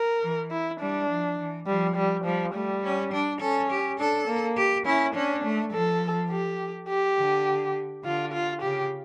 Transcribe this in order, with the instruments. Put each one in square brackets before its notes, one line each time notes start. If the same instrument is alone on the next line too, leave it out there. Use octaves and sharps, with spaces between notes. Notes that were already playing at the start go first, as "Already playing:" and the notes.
Already playing: [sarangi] A#4
[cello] E3
[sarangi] E4
[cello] G3 [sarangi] D4
[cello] F3
E3
[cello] F3 [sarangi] G3
[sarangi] G3
[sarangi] F3 [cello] G3
[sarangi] G3 [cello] A3
[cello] C#4
D4
[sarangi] C#4 [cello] A4
[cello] G4
[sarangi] D4 [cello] A4
[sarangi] A#3
[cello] G4
[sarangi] C#4 [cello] E4
[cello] C#4 [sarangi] D4
[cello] A3
[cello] F3 [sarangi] A4
[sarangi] G4
G4
[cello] D3
[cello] D3 [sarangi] F4
[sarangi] F4
[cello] C#3 [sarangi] G4